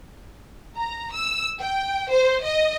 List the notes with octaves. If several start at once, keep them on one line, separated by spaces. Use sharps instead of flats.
A#5
E6
G5
C5
D#5